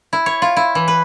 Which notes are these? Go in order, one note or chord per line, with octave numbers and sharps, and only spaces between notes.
E4
C#5
F4
E4
E3
B4